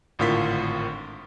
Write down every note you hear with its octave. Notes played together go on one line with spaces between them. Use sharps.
G#1 A2 D3 F4 A#4 B6